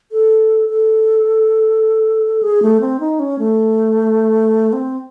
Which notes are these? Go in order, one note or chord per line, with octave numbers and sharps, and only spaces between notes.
A4
A4
G#4
A3
C4
D#4
C#4
A3
C4